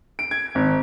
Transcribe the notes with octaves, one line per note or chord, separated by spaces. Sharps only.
D7
G#6
G#1